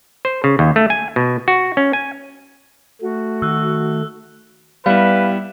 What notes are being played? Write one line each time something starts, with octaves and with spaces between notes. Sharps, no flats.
C5
C#3
D#2
A3
G#5
B2
F#4
C#4
G#5
A3 F#4
D#3 E6 F#6
G3 B3 E4 B4 F5